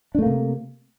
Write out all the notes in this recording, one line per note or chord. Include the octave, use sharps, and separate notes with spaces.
C3 A3 A#3 D4